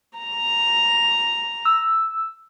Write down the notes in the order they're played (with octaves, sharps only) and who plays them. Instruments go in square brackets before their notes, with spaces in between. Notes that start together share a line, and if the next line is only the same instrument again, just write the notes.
[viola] A#5
[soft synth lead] E6